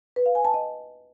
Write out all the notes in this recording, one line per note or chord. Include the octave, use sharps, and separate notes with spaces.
B4
F5
G#5
A5
D#5